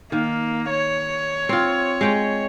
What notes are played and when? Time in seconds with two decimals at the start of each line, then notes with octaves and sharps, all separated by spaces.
0.12 D#3 A#3
0.70 C#5
1.49 C4 F4
2.01 G#3 G5